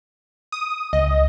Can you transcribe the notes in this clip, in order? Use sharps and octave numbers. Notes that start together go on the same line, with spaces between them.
D#6
C#2 D#5